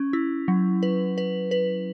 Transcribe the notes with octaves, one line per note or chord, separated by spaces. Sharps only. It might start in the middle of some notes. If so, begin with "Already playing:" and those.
Already playing: C#4
E4
F#3
B4
B4
B4